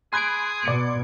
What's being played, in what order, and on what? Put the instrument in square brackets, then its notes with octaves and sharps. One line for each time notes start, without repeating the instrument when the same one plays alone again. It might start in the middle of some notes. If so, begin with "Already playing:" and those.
[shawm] G#4 [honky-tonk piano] G#5 B5 F#6 [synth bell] C6 G#6 D7
[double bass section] B2 [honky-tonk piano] D5 C#7